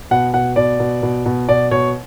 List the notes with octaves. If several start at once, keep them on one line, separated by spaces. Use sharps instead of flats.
B2 F#5
B2 F#5
B2 D5
B2
B2
B2
B2 D5
B2 C#5